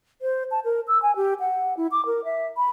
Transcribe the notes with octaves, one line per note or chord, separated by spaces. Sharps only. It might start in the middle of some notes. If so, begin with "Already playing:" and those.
C5
A5
A#4
E6
G#5
G4
F#5
E4
D6
A#4
E5
B5